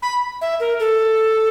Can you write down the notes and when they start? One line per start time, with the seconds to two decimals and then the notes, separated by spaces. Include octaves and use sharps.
0.02 B5
0.41 E5
0.60 A#4
0.80 A4